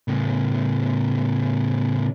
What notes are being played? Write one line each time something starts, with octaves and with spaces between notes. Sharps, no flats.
A2 C#3